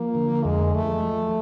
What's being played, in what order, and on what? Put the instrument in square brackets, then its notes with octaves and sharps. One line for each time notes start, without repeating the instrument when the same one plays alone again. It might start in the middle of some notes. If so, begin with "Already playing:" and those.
Already playing: [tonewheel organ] F3 [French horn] A#3
[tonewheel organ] D3
[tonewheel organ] F2 [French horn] G#3
[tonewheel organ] F3 [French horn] A3
[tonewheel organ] F3